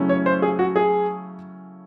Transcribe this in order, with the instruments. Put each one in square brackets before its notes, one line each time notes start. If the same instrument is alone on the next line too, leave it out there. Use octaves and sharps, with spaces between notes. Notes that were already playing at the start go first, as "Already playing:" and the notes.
Already playing: [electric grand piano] C#3 F#3 A3 C#4 E4
[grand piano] C#5
C5
G#4
F#4
G#4